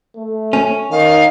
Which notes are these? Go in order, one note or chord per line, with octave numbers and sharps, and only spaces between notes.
A3
C#4
D#3 F5